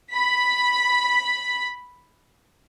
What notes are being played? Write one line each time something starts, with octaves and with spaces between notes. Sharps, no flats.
B5 B6